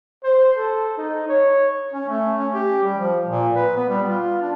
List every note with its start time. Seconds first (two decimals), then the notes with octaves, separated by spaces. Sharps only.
0.24 C5
0.57 A4
0.97 D#4
1.28 C#5
1.93 C#4
2.08 A3
2.38 C#4
2.54 G4
2.83 G3
2.98 F3
3.28 A#2
3.53 B4
3.76 B3
3.89 G3
4.09 F4
4.42 D4